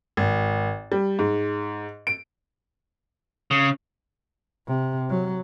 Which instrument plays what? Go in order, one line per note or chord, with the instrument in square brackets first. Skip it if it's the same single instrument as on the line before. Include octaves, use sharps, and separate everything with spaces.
[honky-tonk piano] G#1
G3
G#2
D7
[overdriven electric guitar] C#3
[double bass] C3
F#3